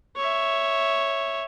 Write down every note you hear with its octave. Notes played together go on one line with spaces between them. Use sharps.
C#5 E5